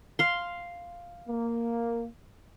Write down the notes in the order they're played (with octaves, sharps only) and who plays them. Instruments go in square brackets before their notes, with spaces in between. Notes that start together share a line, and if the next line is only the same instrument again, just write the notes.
[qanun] F5 C6
[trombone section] A#3